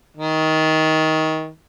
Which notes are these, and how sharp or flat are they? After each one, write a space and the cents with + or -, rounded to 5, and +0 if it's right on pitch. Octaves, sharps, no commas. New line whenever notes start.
D#3 +20